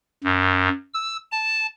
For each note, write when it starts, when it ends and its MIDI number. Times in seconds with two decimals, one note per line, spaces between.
0.24 0.69 42
0.94 1.17 88
1.32 1.67 81